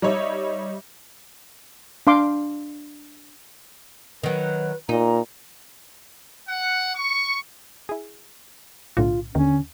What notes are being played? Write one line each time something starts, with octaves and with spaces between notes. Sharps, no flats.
G3 D#4 C#5 E5
D4 F5 C6 D6
D#3 F#3 B4
A#2 D#4 A#5
F#5
C#6
E4 G#4
B1 A2 D3 F4
D#2 D3 C#4